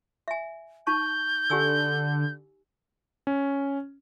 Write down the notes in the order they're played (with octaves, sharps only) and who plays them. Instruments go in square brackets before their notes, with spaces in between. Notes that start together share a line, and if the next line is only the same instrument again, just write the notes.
[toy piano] E5 G#5
[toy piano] D#4 A5 C#6 [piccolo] G6
[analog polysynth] D3 [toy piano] G4 G#5 E6
[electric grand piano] C#4